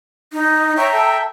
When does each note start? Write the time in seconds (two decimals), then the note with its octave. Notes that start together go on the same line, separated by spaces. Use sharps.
0.33 D#4
0.77 C#5 E5 G5 A#5
0.93 A4 E5 G5